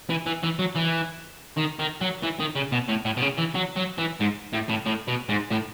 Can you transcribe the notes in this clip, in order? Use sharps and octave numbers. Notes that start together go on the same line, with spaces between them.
E3
E3
E3
F#3
E3
D#3
D#3
F#3
E3
D#3
C#3
B2
A2
A2
B2
C#3
E3
F#3
F#3
E3
G#2
A2
A2
A2
B2
G#2
A2